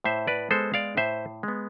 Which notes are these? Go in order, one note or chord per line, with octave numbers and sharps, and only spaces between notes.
A2 C5 E5
B4 D5
G#3 B3 A4 C5
D5 F5
A2 C5 E5
G#3 B3